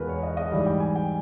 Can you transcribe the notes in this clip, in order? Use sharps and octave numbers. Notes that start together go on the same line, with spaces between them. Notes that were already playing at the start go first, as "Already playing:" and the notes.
Already playing: E2 B2 G#3 F4 A#4 B4
C#5
D#5
D#5
G#2 E3 G3 E5
G5
G#5
G5